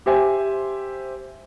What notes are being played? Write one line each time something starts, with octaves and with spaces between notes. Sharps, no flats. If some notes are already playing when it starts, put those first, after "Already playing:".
G4 C5 E5 G#5